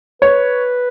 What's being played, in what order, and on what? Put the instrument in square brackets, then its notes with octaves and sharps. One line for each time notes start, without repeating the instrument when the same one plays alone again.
[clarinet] B4 [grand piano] C#5